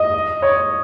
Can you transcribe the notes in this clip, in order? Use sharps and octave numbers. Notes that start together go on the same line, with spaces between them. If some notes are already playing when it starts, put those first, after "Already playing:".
Already playing: D#5
C#5